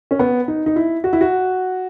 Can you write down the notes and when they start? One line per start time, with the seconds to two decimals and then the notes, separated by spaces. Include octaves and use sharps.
0.11 C#4
0.19 B3
0.48 D#4
0.66 D#4
0.76 E4
1.04 F#4
1.13 E4
1.21 F#4